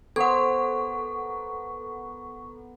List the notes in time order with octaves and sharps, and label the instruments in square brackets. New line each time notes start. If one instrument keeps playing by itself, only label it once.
[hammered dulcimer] B3 A#4 C5 [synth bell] A4 F#5 [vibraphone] C#6